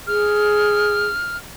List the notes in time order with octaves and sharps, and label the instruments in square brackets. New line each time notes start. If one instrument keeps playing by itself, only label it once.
[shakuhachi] G#4 [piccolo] F6